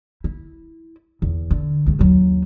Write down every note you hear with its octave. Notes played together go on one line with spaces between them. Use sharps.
E4
E2
D3
C#2 A3
D#2 F#3